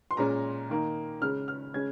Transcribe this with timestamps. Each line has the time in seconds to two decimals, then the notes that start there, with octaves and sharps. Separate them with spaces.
0.11 C6
0.17 A#2 G#3 C#4 A#5
0.70 D#3 A#3 D#4
1.21 C#3 G#3 C#4 F6
1.48 F6
1.74 C#3 G#3 C#4 G#6